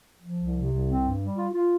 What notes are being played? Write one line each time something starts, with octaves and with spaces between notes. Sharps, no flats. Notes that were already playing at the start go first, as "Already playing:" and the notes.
F3
C2
C3
C2
C4
G2
G3
F4
F4